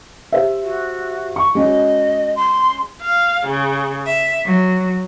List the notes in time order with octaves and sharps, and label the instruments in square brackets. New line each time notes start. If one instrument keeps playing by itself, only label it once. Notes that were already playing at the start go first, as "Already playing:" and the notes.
[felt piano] G4 C5 E5
[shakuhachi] F#4
[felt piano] C#6
[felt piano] G#3 C#4 F#4 [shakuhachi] D#5
[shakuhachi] C6
[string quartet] F5
C#3
E5
F#3